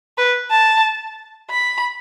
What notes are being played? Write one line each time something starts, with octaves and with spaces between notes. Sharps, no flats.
B4
A5
B5